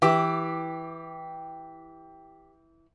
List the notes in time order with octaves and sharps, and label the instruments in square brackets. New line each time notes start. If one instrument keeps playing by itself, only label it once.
[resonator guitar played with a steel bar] E3 [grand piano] G4 D6